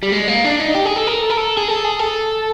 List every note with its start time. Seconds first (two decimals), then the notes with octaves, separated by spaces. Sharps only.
0.03 G3
0.12 G#3
0.28 A#3
0.44 D4
0.60 D#4
0.74 G4
0.85 G#4
0.96 A4
1.07 A#4
1.22 A4
1.30 A#4
1.37 A4
1.57 G#4
1.68 A4
1.84 G#4
1.99 A4